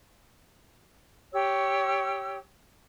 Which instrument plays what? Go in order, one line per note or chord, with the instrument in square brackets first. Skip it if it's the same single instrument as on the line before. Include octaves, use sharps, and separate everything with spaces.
[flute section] G4 C#5 E6